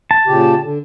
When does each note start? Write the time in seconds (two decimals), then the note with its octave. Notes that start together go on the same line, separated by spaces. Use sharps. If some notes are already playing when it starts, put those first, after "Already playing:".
0.11 A5
0.27 A#2 C#3 G4
0.62 D3